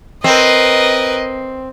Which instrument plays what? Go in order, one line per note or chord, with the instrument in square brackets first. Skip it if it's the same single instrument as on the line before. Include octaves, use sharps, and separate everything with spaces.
[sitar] C4 [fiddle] A#4 B4 [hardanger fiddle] D#5